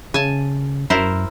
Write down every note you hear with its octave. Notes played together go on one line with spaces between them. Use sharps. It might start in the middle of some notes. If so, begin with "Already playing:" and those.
C#3 G#5 A5
F#2 E4 A#4 C5